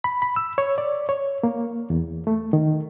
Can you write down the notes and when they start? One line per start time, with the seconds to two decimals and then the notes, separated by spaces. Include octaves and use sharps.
0.04 B5
0.22 B5
0.36 E6
0.58 C#5
0.78 D5
1.09 C#5
1.43 A#3
1.90 E2
2.27 A3
2.53 D#3